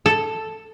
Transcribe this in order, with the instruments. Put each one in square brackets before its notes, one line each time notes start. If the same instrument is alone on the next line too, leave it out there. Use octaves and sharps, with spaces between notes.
[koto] A4